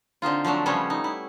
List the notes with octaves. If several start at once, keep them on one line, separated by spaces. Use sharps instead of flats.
D3 C4 D#4 F4
F3 F#3 A3 D4
C#3 F3 G3 B3 C#4 A4
D#4
E4